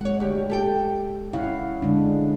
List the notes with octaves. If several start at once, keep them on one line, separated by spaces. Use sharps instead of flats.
G#3 C#5 F#5
D2 G4
G4 A4 G5
C#3 E4 F5 F#5
D3 G#3 D4